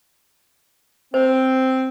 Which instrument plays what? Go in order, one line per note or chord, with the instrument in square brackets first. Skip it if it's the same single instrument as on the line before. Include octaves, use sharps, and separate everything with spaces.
[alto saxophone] C4 [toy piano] C5